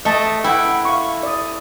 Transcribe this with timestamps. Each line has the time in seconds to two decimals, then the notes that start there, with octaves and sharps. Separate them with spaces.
0.05 A3 D#5 A5
0.44 E4 F#5 G5
0.85 F5 C#6
1.23 D5 D#6